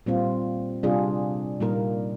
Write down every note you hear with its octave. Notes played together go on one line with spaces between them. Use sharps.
A#2 G3 C4 F4
C3 G3 D4 F4 G#4
A#2 G3 A#3 D#4 A#4